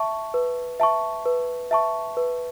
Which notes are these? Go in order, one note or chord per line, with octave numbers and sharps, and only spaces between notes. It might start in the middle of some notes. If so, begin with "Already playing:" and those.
Already playing: E5 A5 C#6
B4
E5 A5 C#6
B4
E5 A5 C#6
B4